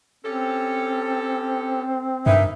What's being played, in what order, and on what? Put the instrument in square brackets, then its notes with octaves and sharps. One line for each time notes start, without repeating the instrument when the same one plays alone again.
[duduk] C4 [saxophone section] C#4 G4 A4
[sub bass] G2 [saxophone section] E3 A#3 D#4 [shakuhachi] E5